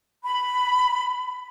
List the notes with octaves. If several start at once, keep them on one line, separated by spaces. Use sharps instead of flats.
B5